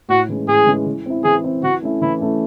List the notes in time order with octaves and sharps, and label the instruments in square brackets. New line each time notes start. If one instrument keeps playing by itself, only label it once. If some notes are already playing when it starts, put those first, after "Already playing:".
[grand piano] A2 [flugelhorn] F#4
[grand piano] E3 G#3 C#4
[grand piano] A2 [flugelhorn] G#4
[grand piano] E3 G#3 C#4
E3
C4 E4
[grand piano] E3 [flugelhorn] G#4
[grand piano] C4 E4
[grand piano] E3 [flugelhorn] F#4
[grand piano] A3 C#4 E4
[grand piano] E3 [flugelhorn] E4
[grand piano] A3 C#4 E4